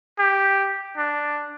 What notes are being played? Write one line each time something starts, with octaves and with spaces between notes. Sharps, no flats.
G4
D4